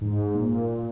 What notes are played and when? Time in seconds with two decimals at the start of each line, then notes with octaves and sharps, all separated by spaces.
0.01 G#2
0.34 A#2